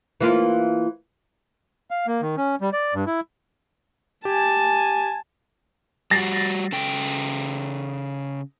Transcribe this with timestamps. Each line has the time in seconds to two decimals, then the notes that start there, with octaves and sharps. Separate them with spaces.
0.21 E3 A#3 F4
1.91 F5
2.07 A#3
2.22 D#3
2.37 C#4
2.61 G3
2.73 D5
2.94 G2
3.07 E4
4.25 G4 G#5 A5
6.11 G3 F#4 A6 A#6 C7
6.72 C#3 A4 G5